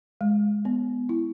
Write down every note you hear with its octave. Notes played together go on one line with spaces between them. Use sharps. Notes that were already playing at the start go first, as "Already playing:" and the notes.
G#3
B3
E4